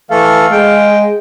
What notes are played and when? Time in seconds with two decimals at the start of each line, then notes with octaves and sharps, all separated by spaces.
0.11 E3 A3 A4 F5
0.51 G#3 G5